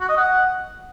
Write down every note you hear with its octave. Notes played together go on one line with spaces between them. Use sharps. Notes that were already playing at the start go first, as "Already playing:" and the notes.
F#4
D#5
F#5